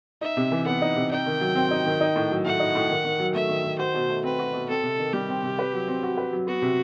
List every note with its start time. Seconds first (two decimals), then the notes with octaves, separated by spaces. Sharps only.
0.21 D#4 E5
0.37 C3
0.52 E3
0.66 B3 F#5
0.81 D#4
0.96 C3
1.11 D#4 G5
1.26 D#3
1.41 F#3
1.55 C4
1.71 D#4
1.85 D#3
2.00 D#4
2.15 A2
2.31 F#3
2.45 A3 F#5
2.60 D#4
2.75 A2
2.89 D#3
3.05 D#3
3.19 F#3
3.34 A3 E5
3.49 D#3
3.64 D#3
3.79 F#4 C5
3.94 B2
4.10 A3
4.24 C4 B4
4.39 F#4
4.53 B2
4.69 C4 A4
4.83 C3
4.99 D#3
5.13 G3 G4
5.29 C4
5.43 C3
5.59 B4
5.73 F#3
5.88 C4
6.03 F#4
6.17 B4
6.33 F#3
6.47 B3 F#4
6.62 C3